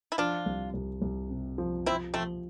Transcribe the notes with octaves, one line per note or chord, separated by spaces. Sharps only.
E4
F3 D4 F4
C2
C2
C2
C3
F3
F3 C4 E4
F3 A3 C4